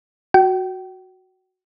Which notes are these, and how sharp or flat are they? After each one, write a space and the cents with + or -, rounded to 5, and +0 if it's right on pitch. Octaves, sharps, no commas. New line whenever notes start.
F#4 +0 G5 -35